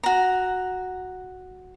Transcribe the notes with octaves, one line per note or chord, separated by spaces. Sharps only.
F#4 A#5